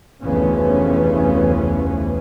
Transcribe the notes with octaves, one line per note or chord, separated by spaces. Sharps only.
F1 D2 C#3 E3 B3 C#4